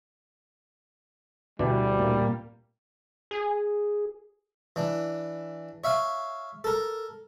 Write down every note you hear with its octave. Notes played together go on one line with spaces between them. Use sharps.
D2 B2 E3 G3 D4
A#2 A#3
G#4
E3 D4
C#5 E5 F5
A4 A#4